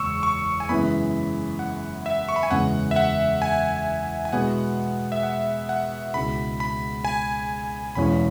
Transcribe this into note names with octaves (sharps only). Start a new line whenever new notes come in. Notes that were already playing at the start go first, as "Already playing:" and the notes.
Already playing: F#1 E2 G#3 C#6 E6
C#6
G#5
F#2 C#3 E3 G#3 B3 B5
F#5
E5
C#6
B5
G#5
F#1 E2 C#3 G#3 B3 F#5
E5
F#5
G#5
G#5
B2 G#3 B3 E4 G#4 F#5
E5
F#5
F#5
C#2 B2 G#3 E4 B5
B5
G#5
E1 E2 E3 G#3 C#4 B5